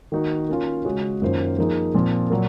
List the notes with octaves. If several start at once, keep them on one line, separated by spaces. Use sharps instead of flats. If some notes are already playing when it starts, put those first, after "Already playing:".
D#3 A#3 D#4 F#4
A#3 C#4 F4
C#3 G#3 C#4 F#4 C#5
F#2 D#3 A#3 F4 C5
F3 A#3 D#4 G#4
A#2 F3 C4
A#2 F#3 A#3